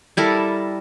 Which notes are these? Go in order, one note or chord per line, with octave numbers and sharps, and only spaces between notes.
G3 E4 A4 A#4